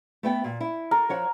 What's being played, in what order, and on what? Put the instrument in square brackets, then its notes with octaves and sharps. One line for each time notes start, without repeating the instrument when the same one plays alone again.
[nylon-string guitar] A3 B3 G5
A#2
E4
[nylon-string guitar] A4 [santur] A#4
[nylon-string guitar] F3 C#5 F#5